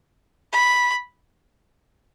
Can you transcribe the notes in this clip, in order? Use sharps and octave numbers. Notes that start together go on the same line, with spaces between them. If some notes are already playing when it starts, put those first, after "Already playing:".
B5